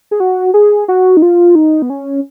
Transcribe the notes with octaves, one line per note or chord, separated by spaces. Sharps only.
G#4
F#4
G#4
F#4
D#4
F4
D#4
B3
C#4